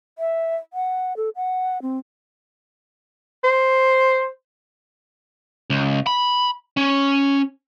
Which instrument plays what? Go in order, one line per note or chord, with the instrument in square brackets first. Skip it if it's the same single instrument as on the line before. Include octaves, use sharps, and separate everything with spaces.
[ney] E5
F#5
A4
F#5
C4
[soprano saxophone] C5
[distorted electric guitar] C#2
B5
C#4